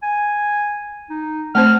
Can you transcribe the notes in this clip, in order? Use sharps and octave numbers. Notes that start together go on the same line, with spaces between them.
G#5
D#4
A3 C4 C5 F6